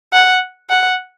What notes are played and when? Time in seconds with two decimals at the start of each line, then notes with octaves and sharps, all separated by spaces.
0.13 F#5
0.70 F#5